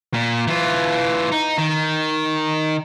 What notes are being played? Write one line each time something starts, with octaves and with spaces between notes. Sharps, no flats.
A#2
E3 F4
D#4
D#3